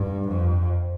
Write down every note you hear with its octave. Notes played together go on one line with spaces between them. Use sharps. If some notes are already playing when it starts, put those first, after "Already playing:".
Already playing: G2
F2